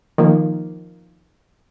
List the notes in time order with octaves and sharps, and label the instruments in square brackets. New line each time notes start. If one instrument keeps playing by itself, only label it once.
[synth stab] D#3 F3 A#3